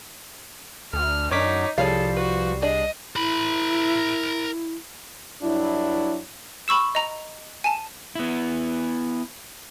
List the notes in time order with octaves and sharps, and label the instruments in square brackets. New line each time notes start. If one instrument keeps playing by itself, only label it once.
[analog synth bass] D2 [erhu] F6
[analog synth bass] F#2 [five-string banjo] D#3 D4 [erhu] D#4 [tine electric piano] C#5 D6 B6
[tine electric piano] C2 G3 C7 [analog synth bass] F3 [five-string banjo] G#4 C#5 F5 [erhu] A4
[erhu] F#4 [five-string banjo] B4
[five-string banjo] D4 G#4 D5 [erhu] D#5
[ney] E4 [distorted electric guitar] A#4 B5
[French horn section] G2 F#3 D4 E4
[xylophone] B5 C#6 E6 E7
D#5 A#5
G#5 A5
[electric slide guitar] B3 E4